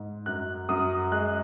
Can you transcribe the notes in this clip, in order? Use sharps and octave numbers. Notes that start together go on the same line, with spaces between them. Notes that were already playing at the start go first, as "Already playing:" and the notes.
Already playing: G#2
F#2 F#6
F#2 D#6
G#3 F#6